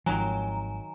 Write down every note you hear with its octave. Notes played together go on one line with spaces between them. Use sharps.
G#1 D#3 F3 F#3 G#5 A#5